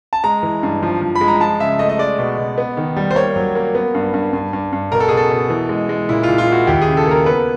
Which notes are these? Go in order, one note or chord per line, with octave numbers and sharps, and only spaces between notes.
A5
G#3 A#5
E3
G2
F3
F3
B5
G#3
A#5
F3 A5
C#3 E5
A3 D#5
D#5
G#3 D5
B2
B2
B3
D#3
G3
C5
A#3 C#5
F#3
A#3
B3
G2
G2
G2
G2
G2
B2 A#4
A4
B2 G#4
A4
B2
E3
G#3
G#3
A#2 E4
F4
A#2
F4
E4 F#4
D#2 G4
G#4
C#3
A4
A#3
A#4
B3 B4